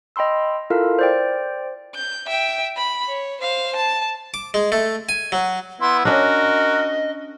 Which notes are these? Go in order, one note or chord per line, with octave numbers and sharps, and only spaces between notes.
D#5 G5 B5 C6 E6
E4 F4 A4 A#4 F5
C5 D5 G5
G6
E5 G5
B5
C#5
C5 F5
A5
D6
G#3
A3
G#5
F#3
B3 E4 C6
C#4 D4 F#4 A#4 D#5